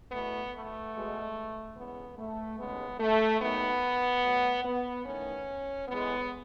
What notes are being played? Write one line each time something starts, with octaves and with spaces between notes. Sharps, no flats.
E2 B2 A3 B3
A3
B2 G#3
E2 C#3 G#3 B3
A3
D#2 C#3 G#3 B3
A3
D#2 D#3 F#3 A3 B3
B2 F#3 A3
B3
E2 D#3 A3 C#4
A2 G#3 B3